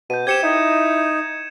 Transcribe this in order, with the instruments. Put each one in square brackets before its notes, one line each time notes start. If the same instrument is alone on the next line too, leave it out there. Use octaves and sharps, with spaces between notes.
[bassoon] B2 [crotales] G6 D#7
[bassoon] C4 [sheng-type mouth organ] G4 G6 [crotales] G#6 C#7 E7
[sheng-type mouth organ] D#4 [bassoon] E4